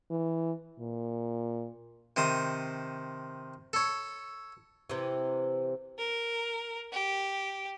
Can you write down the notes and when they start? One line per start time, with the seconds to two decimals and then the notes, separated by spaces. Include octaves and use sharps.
0.11 E3
0.79 A#2
2.16 C3 D#3 C5 D#6
3.73 A4 C#5
4.90 C3 E3
5.98 A#4
6.92 G4